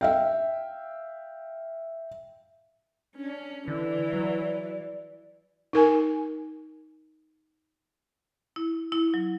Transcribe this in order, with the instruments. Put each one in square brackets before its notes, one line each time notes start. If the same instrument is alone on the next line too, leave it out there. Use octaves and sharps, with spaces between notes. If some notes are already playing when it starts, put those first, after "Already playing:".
[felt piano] E5 F5 G5
[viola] C#4 [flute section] D4
[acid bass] D3 [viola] E3 [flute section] D5
[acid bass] F#3
[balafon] D#4 A#4 G#5
[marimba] E4
E4
F#3